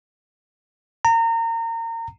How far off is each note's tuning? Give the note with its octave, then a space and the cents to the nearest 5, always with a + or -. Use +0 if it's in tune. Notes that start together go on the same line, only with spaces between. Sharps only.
A#5 -30